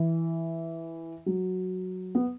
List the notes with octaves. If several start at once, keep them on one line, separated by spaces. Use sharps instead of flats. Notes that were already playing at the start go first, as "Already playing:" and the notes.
Already playing: E3
F#3
B3